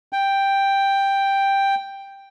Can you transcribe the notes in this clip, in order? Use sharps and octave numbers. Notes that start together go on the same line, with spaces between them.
G5